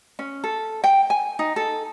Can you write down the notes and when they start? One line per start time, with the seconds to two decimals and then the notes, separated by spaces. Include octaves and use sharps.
0.19 C#4
0.44 A4
0.84 G5
1.10 G#5
1.39 D#4
1.56 A4